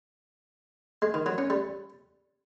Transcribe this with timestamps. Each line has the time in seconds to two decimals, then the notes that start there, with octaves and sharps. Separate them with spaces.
1.02 G#3
1.14 D#3
1.26 F#3
1.38 C#4
1.50 G3